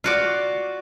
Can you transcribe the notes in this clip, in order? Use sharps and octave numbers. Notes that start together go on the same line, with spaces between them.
F4 F#4 D5